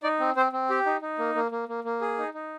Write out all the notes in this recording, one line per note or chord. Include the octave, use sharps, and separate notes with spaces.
D#4 D5
C4
C4 C5
C4
G4
D#4
D#4
A#3
A#3
A#3
A#3
A#3
G#4
D#4
D#4